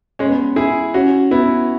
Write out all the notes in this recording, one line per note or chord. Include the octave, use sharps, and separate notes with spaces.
G#3 C#4
B3
E4 G#4
C#4 F#4
B3 E4